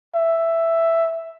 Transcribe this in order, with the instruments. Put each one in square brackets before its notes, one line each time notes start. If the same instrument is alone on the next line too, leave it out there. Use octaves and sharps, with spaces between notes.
[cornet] E5